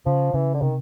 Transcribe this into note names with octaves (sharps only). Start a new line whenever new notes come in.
C#3 F3
C#3 E3
D3
C3 D#3